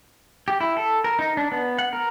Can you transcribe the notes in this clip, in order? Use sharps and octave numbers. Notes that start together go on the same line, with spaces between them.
G4
E4
A4
A#4
D#4
D4
B3
F#5
A#4